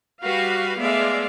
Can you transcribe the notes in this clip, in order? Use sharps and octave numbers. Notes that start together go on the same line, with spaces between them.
G3 F#4 B4 F5
G#3 A3 B3 D5 E5 F5